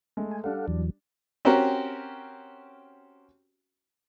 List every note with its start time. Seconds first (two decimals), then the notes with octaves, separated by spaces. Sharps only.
0.17 G#3 A3
0.31 G#5
0.44 G3 D4 A4 F5 F#5
0.68 E2 E3 F#3
1.45 C4 C#4 F#4 G4 A#4